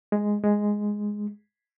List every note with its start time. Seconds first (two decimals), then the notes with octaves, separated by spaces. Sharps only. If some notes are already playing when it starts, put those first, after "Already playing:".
0.12 G#3
0.44 G#3